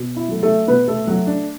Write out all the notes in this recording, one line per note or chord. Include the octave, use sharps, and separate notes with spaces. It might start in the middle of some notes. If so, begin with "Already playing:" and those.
Already playing: B2
E4
F#3 A3
A3 A4
B2 B3 B4
A3 A4
F#3 A3 F#4
D4